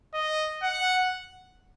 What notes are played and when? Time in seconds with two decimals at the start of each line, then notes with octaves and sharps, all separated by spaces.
0.14 D#5
0.63 F#5